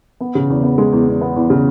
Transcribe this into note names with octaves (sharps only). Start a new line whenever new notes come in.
B3
C#3
E2
B3
G#3
E2
E2
B3
E2
C#3